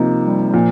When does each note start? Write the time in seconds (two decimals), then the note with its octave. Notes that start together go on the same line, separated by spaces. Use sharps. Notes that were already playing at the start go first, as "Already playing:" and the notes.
Already playing: C3 F3 A#3 D#4
0.23 G3
0.50 G3
0.54 A#2 F3